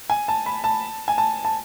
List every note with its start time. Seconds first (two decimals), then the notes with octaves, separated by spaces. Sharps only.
0.10 G#5
0.28 A5
0.46 B5
0.64 A5
1.08 G#5
1.18 A5
1.45 A5